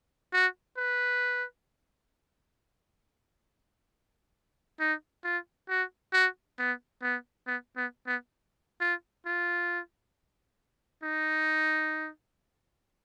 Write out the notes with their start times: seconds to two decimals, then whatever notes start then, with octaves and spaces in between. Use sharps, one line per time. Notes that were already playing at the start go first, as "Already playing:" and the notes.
0.33 F#4
0.77 B4
4.80 D#4
5.24 F4
5.69 F#4
6.13 F#4
6.58 B3
7.02 B3
7.47 B3
7.77 B3
8.07 B3
8.80 F4
9.26 F4
11.03 D#4